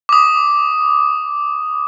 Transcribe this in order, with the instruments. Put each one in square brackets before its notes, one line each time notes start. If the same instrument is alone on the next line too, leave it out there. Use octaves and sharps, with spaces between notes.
[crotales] D6 D#6